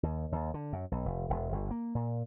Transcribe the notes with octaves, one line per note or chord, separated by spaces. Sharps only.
D#2
D#2
D3
F#2
B1
F1
E1
G1
A#3
A#2